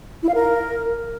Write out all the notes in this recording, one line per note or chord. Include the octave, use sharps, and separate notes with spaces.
E4
F5
A#4